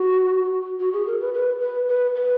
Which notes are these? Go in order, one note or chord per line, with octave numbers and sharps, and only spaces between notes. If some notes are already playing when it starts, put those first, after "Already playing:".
Already playing: F#4
F#4
G#4
A#4
B4
B4
B4
B4
B4